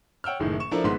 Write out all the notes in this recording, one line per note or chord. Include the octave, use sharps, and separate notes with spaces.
C#5 F#5 G5 E6 F6
F#1 A2 D#3
C#6 E7
F3 D4 E4 A4 A#4
G#1 G#2 B3 C6 B6